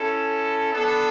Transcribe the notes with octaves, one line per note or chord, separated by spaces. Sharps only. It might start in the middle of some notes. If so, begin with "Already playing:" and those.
Already playing: C#4 E4 A4
B3 D4 A4